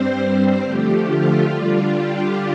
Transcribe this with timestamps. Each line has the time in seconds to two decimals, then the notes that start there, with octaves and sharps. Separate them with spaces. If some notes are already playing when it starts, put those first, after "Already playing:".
Already playing: G2 G3 C4 C5
0.19 C5
0.63 D3 F3 A3 G4
1.06 F4
1.50 D3 G3 D4
1.94 G4